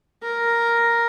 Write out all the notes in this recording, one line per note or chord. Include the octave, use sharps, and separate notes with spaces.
A#4